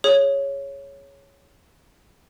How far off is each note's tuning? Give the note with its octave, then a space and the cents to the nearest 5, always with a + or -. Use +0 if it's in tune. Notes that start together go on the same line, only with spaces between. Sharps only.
G#4 +0 C#5 +0